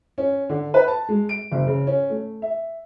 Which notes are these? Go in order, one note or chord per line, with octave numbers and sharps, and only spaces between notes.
C#4
D3
B4
A5
G#3
D7
F#1
C#3
C#4
A3
E5